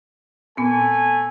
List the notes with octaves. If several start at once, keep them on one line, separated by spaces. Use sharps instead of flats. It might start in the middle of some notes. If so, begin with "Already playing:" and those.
A#2 A3 B3 C4 G#5